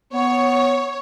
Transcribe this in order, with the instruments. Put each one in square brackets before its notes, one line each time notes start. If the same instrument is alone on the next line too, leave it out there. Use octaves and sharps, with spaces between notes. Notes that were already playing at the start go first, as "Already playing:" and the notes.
[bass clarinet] B3 [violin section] C#5